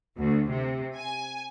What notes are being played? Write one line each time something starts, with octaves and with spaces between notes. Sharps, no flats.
D2
C3
G#5